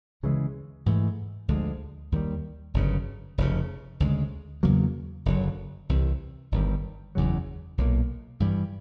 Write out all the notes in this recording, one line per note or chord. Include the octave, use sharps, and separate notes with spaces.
D2 C#3 E3 G#3
G#2 E3 A3
D2 D3 F3 G#3
D#2 D#3 G3
G1 F#2 C#3
F1 F2 C#3
D2 C#3 E3 G#3
E2 C#3 F#3 A#3
F#1 F2 D3 F#3
C2 C3 E3
G1 G2 D#3 G3
F#1 E2 C#3 F#3
B1 A#2 G3 A#3
G2 E3 G3